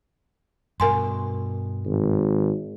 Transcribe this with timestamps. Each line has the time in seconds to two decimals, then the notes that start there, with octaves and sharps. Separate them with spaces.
0.80 G2 B2 A#4 G#5 C6
1.86 G#1